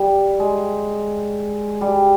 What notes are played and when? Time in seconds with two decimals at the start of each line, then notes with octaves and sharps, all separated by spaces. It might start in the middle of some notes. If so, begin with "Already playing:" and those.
Already playing: G3
0.40 G#3
1.81 G3